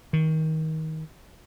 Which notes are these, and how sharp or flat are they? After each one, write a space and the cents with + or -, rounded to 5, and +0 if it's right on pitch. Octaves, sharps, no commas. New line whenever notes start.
D#3 +25